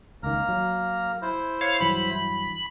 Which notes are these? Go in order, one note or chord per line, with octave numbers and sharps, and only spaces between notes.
C#2 D#3 A#3 A#5 F6
F#3
E4 C5
C#5 F5
G2 E3 F#3 B5